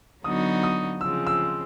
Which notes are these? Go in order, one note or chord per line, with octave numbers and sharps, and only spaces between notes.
D3 F#3 B3 D#4 F#4 D#6
D#6
C#3 F3 G#3 C4 E6
E6